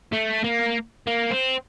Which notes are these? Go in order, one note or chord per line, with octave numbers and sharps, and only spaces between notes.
A3
A#3
A#3
C4